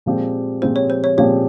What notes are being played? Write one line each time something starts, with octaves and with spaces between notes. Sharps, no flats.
A#2 F3 G#3 C4 G4
A#2 F3 G#3 C4 G4 C5
C#5
C5
C#5
A#2 F3 G#3 C4 G4 C#5